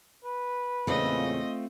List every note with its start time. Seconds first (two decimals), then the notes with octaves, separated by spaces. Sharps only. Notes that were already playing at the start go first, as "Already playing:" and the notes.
0.24 B4
0.87 E2 A#2 C#3 A3 C4 F4 D#5